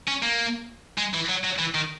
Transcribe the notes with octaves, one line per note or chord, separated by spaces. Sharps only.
C#4
A#3
G#3
E3
F#3
F#3
E3
D#3